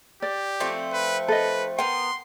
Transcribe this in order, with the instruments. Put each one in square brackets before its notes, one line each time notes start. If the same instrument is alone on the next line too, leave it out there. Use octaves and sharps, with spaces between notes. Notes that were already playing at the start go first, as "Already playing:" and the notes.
[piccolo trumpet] G4 [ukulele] D5
[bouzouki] F3 A3 C4
[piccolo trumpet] B4
[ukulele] A4 D#5 [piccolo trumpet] B4
[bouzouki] B3 A#4 [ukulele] F#5 G5 [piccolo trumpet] C6